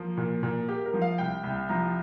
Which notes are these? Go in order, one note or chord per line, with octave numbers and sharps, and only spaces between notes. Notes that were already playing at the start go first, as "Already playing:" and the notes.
Already playing: F3 A#3
A#2
A#2
A#3 G4
A#4
F3
F5
C2 G5
C2
F3 A#5